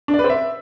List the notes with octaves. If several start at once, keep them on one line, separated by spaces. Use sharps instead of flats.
D4
D5
B4
C4
E5